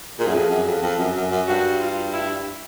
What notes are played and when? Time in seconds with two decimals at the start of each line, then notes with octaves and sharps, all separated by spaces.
0.18 A#2 G#4
0.28 F#2
0.35 F2
0.50 F#2
0.67 F2
0.83 F2
0.99 F#2
1.16 F#2
1.31 F#2
1.47 G2 F#4
1.80 F4
2.13 E4